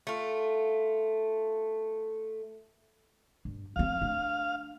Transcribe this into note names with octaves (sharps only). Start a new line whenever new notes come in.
A3 F4
G2
F3 C4 F5
A3 D4